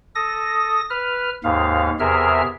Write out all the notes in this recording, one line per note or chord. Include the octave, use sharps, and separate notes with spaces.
A4 D#6 A#6
B4 F6
D#2 G#2 F5
E2 C3 G#4 A#4 E5 F6